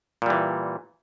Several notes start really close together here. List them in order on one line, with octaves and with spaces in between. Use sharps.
A#2 G3 E3